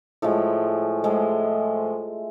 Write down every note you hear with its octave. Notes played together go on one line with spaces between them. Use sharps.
A2 F3 G#3
A2 F3 G#3